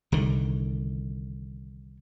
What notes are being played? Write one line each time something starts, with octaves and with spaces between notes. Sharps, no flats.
C2 D3 D#3